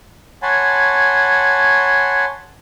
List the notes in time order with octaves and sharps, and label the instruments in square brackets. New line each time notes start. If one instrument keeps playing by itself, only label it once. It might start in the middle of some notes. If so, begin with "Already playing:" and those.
[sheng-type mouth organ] C#5 F#5 G#5 A5 B5 C6